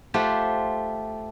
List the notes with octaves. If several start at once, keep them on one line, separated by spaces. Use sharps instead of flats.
A3 F4 G4 C5 F#5